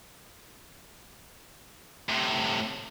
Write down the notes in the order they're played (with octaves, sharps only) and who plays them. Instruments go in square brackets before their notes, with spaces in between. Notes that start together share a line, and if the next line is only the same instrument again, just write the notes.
[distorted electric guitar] A2 C3